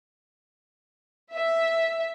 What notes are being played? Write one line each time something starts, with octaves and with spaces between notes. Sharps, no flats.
E5